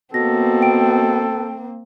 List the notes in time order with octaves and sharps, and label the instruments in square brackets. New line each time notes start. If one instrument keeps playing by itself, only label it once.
[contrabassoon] B2 [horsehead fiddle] A#3 C4 [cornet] A4 [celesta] A#6
[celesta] G5 D7